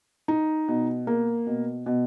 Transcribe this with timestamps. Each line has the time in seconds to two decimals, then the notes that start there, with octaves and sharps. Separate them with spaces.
0.28 D#4
0.68 B2
1.07 A#3
1.47 B2
1.86 B2